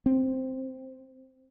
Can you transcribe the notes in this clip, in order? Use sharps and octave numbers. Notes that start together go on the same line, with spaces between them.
C4